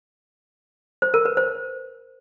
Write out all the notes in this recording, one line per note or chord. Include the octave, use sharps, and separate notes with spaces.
C5
A#4
B4
C5